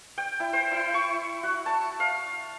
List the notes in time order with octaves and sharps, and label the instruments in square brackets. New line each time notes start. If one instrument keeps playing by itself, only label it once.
[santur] G5
E4
C5
E4
C#6
F#4
A5
F5